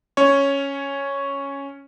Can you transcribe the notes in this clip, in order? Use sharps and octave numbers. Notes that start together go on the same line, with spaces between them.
C#4 C#5